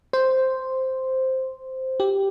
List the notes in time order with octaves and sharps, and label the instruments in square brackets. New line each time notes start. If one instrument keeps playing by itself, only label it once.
[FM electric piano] C5
G4